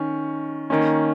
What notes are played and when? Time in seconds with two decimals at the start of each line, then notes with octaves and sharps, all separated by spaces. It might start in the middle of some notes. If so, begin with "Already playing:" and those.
Already playing: D#3 C#4
0.70 D#3 A#3 C#4